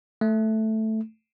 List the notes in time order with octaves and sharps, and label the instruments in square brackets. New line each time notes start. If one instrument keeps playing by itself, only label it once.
[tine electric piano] A3